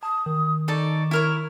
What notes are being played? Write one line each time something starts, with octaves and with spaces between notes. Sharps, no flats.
A5 D#6
D#3
D#4 A4 D5 C#6
E4 A#4 C#5